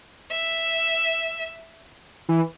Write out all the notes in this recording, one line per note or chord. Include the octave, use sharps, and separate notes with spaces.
E5
E3